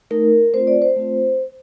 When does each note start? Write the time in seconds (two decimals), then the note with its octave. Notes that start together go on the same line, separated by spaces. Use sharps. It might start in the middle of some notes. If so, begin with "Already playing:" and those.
0.11 A3 D#4 A#4
0.54 A3 C4 F4 C5
0.67 D5
0.82 C5
0.96 A3 C4 F4